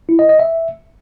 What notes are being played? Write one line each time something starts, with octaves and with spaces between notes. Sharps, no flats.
E4
D#5
D#5
E5